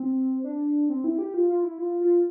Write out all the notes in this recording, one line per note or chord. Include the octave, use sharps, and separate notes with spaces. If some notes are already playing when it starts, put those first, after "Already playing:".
Already playing: C4
D4
C4
E4
G4
F4
F4
E4
F4
F4